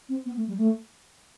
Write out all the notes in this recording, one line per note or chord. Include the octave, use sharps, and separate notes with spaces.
C4
B3
A3
G3
A3